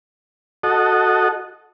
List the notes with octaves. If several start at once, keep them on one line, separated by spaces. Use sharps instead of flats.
F#4 A4 D#5